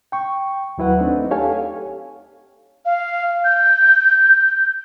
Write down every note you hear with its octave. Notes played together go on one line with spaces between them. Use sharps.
G5 C#6
D#2 F#3 E4 B4 F#5
A3 C4 D4 D#4
G4 A4 C#5 F5 G#5
F5
G6